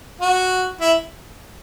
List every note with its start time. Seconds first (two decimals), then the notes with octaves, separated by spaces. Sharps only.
0.21 F#4
0.81 E4